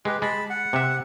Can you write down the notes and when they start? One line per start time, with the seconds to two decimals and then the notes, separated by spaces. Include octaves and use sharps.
0.05 G#3 G4 B4
0.22 G#3 A5 B5
0.50 F#5
0.73 C3 E5